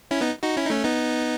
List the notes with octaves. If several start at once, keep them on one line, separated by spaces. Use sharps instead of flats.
C#4 E4
B3 D#4
D#4 F#4
C#4 E4
D#4
A3 C#4
B3 D#4